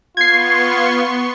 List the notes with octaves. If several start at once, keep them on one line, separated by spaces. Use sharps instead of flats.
B3 F4 C6 C#6 G#6 C7